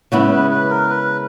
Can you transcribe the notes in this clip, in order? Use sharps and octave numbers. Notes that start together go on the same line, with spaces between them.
C#3 G#3 B3 E4 B4
B4
B4
A#4
B4